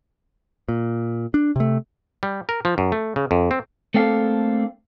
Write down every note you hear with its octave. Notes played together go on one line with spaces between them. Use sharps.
A#2
D4
C3 A3
G3
A#4
F3
F#2
A3
C#3
F2
C4
A3 A#3 C4 D4 A4 F5